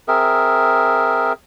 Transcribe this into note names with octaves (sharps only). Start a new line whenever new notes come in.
C4 G#4 A#4 E5